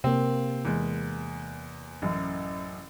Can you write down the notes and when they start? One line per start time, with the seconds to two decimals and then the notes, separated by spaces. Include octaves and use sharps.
0.04 C3 A#3 C4
0.65 E2 G#3
2.02 A1 F#2